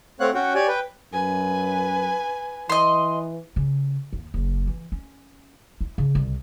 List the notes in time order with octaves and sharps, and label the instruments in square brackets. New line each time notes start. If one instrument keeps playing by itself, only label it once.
[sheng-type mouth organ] A3 C4 C#5 F5 F#5 F#6
C#4 F#4 F#5 G5
G4 C#5 D5 G#5
B4 G5
[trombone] F#2 [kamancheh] B4 G#5
[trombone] E3 [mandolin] D#5 C6
[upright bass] C#3
D#2
F#1
E3
C#4
E4
C#3
C2